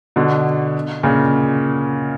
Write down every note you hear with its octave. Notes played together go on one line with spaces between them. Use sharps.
B2 D3
A#2 C#3